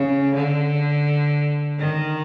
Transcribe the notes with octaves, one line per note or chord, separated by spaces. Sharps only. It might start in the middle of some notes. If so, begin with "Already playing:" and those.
Already playing: C#3
D3
D#3